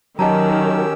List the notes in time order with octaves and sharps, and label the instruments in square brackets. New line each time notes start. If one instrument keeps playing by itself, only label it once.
[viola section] D#3 [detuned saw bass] F#3 [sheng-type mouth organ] C#4 G4 E6 [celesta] D#5 A5 A#5